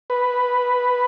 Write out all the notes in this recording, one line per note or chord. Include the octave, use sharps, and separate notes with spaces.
B4